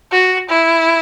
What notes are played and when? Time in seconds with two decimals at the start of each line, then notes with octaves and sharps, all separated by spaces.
0.12 F#4
0.49 E4